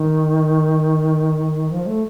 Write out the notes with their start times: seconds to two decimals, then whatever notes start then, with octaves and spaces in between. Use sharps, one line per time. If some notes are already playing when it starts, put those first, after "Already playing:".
Already playing: D#3
1.71 F3
1.86 A3